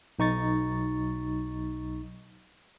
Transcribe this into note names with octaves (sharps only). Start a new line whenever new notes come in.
B1 D#4 C#6 A6